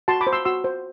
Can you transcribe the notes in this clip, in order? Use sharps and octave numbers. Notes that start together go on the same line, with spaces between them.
F#4 A5 C6
B5 D6
C5
C6 E6
F#4 C6 E6
C5